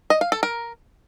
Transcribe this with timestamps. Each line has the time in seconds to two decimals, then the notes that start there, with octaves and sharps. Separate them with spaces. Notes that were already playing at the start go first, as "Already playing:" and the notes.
0.10 D#5
0.21 F5
0.32 A4
0.43 A#4